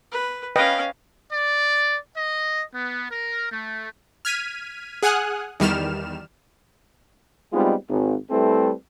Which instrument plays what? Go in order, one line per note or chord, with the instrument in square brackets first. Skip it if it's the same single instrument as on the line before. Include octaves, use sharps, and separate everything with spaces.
[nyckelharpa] B4
[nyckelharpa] C#4 F5 [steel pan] B4 D#5 G5
[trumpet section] D5
D#5
B3
A#4
A3
[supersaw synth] F6 G#6 B6 D#7
G#4 F#5 G#5 D#6 F6 F#6
E2 D#3 G3 F6 E7
[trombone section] G3 G#3 B3 C4 D#4 F4
G#1
G3 A3 C4 E4 A4 B4